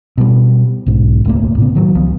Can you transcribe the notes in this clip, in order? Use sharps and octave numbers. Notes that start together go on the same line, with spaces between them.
B2 G3
B1 G#2
D#1 C#2 A3 A#3
A2 C#3 B3
D#3 F#3
C#2 F3 B3